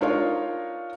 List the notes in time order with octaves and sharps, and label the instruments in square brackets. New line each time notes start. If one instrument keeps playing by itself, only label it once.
[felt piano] D4 D#4 F4 A#4 C#5 F5